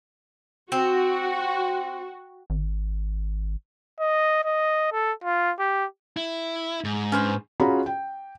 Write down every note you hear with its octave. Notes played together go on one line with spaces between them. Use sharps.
C4 F#4
G#1
D#5
D#5
A4
F4
G4
E4
G#2
C#4 B4 C5
C#4 F4 F#4 G#4 A#5 B5
G5